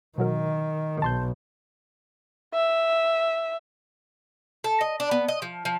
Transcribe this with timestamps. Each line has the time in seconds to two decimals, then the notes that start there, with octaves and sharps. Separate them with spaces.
0.18 B2 D#3 F#3 A#4
1.02 B1 A5 C6 G6
2.54 E5
4.64 A4
4.81 D#5
5.00 D4
5.11 B3
5.28 D#5
5.42 F3
5.65 F3